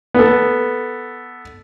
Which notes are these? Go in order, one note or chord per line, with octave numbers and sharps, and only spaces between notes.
B3 A4